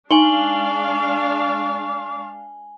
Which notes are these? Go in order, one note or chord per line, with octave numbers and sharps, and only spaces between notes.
G#3 D4 D#4 F5 G#5 C#6 F#7 G7